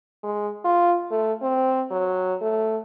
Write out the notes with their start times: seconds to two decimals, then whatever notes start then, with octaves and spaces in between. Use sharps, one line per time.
0.23 G#3
0.65 F4
1.11 A3
1.42 C4
1.91 F#3
2.41 A3